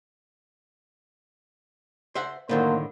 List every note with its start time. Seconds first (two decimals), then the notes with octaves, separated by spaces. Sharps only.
2.15 C5 E5 F#5
2.49 F2 A2 D3 D#3 F#3 A#3 C5